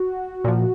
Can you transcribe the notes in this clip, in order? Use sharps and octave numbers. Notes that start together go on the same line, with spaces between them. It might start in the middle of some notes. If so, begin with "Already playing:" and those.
Already playing: F#4
A#2 F3